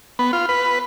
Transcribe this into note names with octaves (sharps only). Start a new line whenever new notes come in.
B3
F4
B4